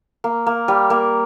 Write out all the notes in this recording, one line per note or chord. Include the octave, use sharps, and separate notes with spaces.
A#3
A#3
G3
A#3